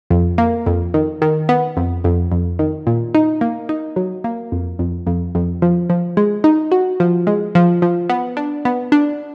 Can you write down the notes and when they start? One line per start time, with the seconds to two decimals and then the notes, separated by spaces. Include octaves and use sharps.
0.10 F2
0.38 A#3
0.66 F2
0.94 D#3
1.22 D#3
1.49 B3
1.77 F2
2.04 F2
2.32 F2
2.59 D#3
2.87 A#2
3.15 D#4
3.41 A#3
3.69 D#4
3.96 F#3
4.24 A#3
4.52 F2
4.79 F2
5.07 F2
5.35 F2
5.62 F3
5.90 F3
6.17 G#3
6.44 D#4
6.72 F#4
7.00 F3
7.27 G#3
7.55 F3
7.82 F3
8.10 B3
8.37 D4
8.65 B3
8.92 D4